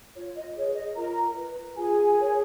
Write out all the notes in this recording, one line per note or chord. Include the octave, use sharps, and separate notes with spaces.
F4 C#5
D#5
G#4 B4 C#5
D#5
F4 A#4 A#5
B4
F4 G#4 G#5
A#4 C#5